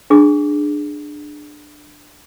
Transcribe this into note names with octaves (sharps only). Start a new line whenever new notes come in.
D4 G#4 D6